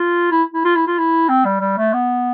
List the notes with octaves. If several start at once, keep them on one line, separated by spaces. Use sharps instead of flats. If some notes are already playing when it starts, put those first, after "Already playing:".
Already playing: F4
E4
E4
F4
E4
F4
E4
C4
G3
G3
A3
B3